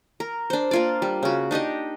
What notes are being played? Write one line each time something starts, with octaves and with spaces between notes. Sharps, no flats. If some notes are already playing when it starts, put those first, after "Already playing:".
A#4
D4 C5
A#3 F4 D5
G3
C#3 F#4
D4 D#4 G4 D#5